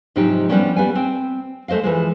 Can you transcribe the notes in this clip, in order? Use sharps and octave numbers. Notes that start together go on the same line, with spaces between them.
G#2 C3 F3 F#3 D#4 G4
F3 G3 G#3 B3 C#4 D4
G3 B3 F5 G#5
C4 G5
G#3 A3 C5 D#5 F5
E3 F3 G#3